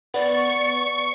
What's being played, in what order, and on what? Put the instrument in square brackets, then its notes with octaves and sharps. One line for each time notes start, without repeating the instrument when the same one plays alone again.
[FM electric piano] B3 [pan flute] D5 [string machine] C#6